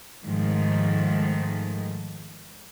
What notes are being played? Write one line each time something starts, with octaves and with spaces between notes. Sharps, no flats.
G#2 D#3 F3 A3